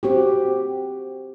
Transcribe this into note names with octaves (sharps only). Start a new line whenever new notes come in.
C4 F#4 G4